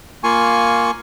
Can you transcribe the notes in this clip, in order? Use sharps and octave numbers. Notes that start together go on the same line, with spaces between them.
A#3 F4 G#5 C#6